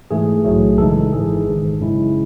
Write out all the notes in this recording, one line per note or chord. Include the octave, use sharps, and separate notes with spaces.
G#2 E3 A3 G#4
B1 A2 F#3 A3
F#2 C#3 E3 G#3 D#4 A4
G#1 G#2 E3 G#4
G#1 G#2 D#3
F#2 C#3 G#3 C#4 E4